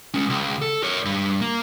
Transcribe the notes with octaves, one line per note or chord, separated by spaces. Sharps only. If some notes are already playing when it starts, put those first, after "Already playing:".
G#3 C#4
C#2
A4
A#4 C#5
G2
A#3